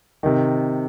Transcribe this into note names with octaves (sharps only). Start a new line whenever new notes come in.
C3 D#3